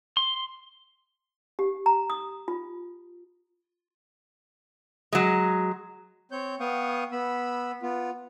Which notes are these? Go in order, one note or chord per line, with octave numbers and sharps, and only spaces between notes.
C6
G4
A#5
D#6
F4
F#3 G#3
C4 C#5 G6
B3 F5 G5 C#6 D#6
B3 B5 E6
B3 F4